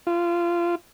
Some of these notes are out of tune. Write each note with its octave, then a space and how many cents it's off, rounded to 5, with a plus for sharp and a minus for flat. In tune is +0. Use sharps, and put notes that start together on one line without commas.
F4 -20